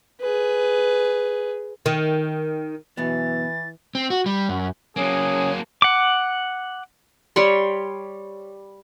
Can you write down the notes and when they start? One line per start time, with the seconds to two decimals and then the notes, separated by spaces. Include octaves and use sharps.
0.21 G#4 B4
1.86 D#3
2.97 F#2 B2 E3 B3 A6
3.95 C4
4.10 F#4
4.26 G3
4.49 F#2
4.97 F#3 A#3 C#4 G#4 C#5
5.82 F#5 D6
7.36 G3 C#5 C6